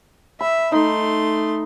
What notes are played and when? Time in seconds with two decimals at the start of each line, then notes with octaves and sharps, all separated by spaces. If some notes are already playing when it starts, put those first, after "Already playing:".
0.40 E5 B5
0.72 A3 D#4 C6